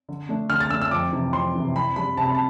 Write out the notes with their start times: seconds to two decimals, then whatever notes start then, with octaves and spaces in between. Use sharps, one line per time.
0.09 D3
0.29 A3 D4
0.50 D3 F6
0.60 A6
0.70 A3 D4 E6
0.81 E6
0.91 F2 D6
1.13 C3 E3
1.33 F2 C6
1.55 C3 E3
1.75 C3 B5
1.96 G3 D4 B5
2.17 C3 A5
2.26 B5
2.35 A5